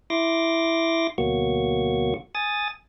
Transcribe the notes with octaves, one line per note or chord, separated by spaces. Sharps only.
E4 C6 D6 A#6
D2 B2 F#3 A#3 F#4 C#6
G#5 D#6 A6